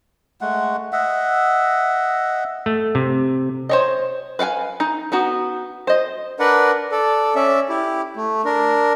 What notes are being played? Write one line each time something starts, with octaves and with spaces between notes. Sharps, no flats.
G#3 A3 F#5
D#5 E5 F#5
A3
C3
C5 C#5 D#5
B4 F5 F#5 G#5
D#4
B3 D#4 F#4
C5 D#5
D4 A#4 B4 D5 F#5
A4 D5
C#4 D5 E5
E4 G4
A3
D4 A#4